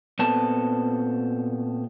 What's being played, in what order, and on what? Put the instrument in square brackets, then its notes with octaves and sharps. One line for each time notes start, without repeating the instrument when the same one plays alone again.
[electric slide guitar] A#2 B3 C4 A4 A5